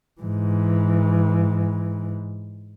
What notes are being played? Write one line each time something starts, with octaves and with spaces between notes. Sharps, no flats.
G#2 E3